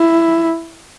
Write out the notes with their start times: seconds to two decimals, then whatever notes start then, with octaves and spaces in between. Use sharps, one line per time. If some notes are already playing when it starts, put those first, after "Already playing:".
Already playing: E4